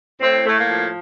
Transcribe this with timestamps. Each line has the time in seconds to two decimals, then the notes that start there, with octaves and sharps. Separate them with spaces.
0.20 A2 C4
0.45 A2 A3
0.57 A#3
0.69 F3